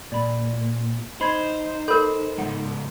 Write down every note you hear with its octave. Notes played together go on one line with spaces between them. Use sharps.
A#2 D5 B5
D#4 C5 B5 G#6
A4 A#4 B5 G6
C#2 F3 F#5